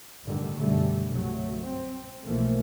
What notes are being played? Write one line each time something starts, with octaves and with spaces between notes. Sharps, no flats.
A1 G2 A#2 D3 D#3 G3
F#2 B2 D3 G3 A3
C2 G2 C3 F#3 A3
C4
B1 B2 E3 F3 A3 A#3